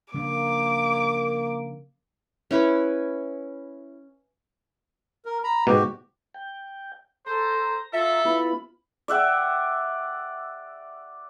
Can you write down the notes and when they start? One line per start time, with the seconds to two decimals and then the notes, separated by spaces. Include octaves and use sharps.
0.14 C#3 F3 A#3 D4 D6
2.51 C#4 E4 B4 C#5
5.25 A#4
5.44 A#5 B5
5.67 G#2 B2 F#4 G4
6.34 G5
7.27 A4 C5 A#5
7.93 F4 A4 E5
8.25 B3 E4 F4 B5
9.08 D5 E5 F#5 G5